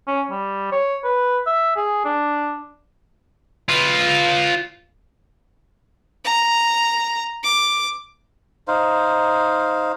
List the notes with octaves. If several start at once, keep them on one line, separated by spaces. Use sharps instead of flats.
C#4
G3
C#5
B4
E5
G#4
D4
F4 B4
A#5
D6
D#4 C5 F5